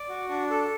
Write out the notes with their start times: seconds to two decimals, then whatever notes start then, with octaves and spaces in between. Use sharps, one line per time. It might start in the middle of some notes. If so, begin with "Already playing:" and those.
Already playing: D5
0.09 F#4
0.29 D4
0.50 A4